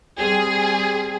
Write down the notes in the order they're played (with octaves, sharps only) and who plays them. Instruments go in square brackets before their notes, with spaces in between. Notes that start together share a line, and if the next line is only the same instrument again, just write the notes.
[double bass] G3 C4 [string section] G#4